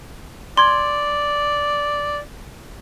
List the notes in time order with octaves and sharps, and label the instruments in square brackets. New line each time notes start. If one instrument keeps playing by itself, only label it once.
[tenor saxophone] D5 [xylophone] C6 G#6